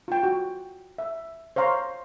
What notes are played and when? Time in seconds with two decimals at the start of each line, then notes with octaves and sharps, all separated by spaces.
0.08 F4 G5
0.23 F#4
0.98 E5
1.56 C5 C#5 F5 A#5 C6